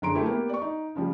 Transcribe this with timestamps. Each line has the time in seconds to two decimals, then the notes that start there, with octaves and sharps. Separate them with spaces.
0.02 F#1 D3 G#4 A#5 C6 D7
0.14 A3 E4 G4
0.26 A#3 B3 G4
0.49 D5 C#6
0.62 D#4
0.95 C#3 F3 G3